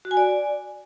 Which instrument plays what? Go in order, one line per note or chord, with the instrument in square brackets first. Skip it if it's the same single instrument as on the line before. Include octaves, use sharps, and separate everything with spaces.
[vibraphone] F#4
G#5
D5